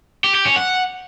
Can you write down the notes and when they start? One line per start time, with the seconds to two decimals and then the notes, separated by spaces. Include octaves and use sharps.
0.24 G4
0.35 G4
0.45 C#4
0.56 F#5